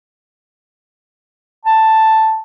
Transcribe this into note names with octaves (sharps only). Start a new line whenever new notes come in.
A5